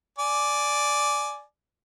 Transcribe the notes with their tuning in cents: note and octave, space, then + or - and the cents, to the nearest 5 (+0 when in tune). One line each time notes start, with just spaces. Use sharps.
D5 +0 G#5 +15